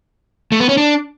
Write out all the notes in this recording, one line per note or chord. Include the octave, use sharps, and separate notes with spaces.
A3
B3
C#4
D4